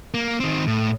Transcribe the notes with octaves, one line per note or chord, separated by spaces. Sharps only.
A#3
D#3 C4
A2